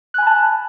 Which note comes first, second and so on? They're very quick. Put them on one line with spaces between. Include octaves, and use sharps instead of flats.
F#6 G#5 B5 A5